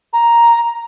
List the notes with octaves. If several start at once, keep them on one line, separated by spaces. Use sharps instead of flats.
A#5